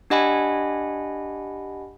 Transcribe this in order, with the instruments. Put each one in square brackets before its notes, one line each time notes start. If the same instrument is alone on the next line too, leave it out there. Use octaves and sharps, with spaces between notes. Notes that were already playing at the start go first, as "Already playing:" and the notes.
[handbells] D4 G4 D#5 F#5 G#5 B5